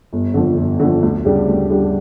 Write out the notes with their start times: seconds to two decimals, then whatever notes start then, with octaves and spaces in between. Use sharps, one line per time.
0.13 G1
0.34 F2 D3
0.57 G1
0.79 D3
0.85 F2
1.02 D2
1.25 C#3 G3 D4 G4
1.48 D2
1.70 C#3 G3 D4 G4